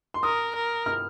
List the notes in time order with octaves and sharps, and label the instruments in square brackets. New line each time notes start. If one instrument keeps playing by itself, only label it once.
[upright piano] C6
[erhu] A#4 [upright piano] D#6
[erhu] A#4
[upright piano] F6